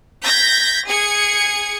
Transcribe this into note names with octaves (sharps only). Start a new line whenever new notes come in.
G6 G#6 A#6 B6
G#4 G#6 C#7